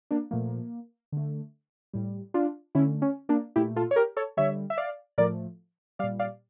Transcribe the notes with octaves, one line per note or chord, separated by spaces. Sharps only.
A#3 D4
A#2 F3 A3 A#3
D3 A3
A2 G3
D4 F4
D3 A3 C#4 E4
C#4
A#3 D4
A#2 A3 E4 G4
F4 A4
C#5
G4 A#4
A4 C#5
D3 G3 C#5 E5
E5
D5 F5
A2 F3 A3 A#4 D5
A#2 G3 D5 F5
D5 F5